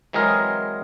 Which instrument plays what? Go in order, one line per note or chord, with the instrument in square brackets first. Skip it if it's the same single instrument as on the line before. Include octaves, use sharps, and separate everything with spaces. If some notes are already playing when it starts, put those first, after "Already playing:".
[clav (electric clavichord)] E3 F#3 G#3 C4 G#4 A#4